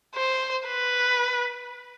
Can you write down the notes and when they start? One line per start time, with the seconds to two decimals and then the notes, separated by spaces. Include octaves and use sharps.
0.16 C5
0.67 B4